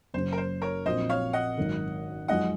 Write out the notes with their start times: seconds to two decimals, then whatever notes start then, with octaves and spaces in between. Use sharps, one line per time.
0.14 F#1 F#2 C#3 C5
0.32 A#4
0.37 C5
0.62 A#4 C#5
0.85 A#1 A#2 F#3 C4 C5 D#5
1.09 C#5 F5
1.33 D#5 F#5
1.58 G#1 F#2 D#3
2.28 F#2 F3 G#3 D#4 D#5 F#5